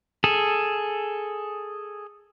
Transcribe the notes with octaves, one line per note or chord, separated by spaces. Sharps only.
G#4 A4